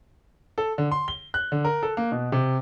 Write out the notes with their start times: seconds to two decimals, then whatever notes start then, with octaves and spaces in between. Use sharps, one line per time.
0.58 A4
0.78 D3
0.91 C6
1.08 G7
1.34 F#6
1.52 D3
1.65 A#4
1.83 A4
1.97 A#3
2.12 B2
2.32 C3